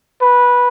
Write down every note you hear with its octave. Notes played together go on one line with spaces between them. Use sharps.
B4